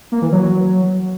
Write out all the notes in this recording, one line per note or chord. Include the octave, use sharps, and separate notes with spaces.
A#3
E3
F#3
F#3